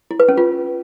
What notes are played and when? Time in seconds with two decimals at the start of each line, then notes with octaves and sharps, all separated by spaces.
0.11 E4
0.20 B4
0.29 C#4
0.38 F4